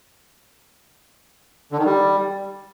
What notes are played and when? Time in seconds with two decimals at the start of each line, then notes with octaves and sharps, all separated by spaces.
1.72 D3
1.79 D#3
1.86 G3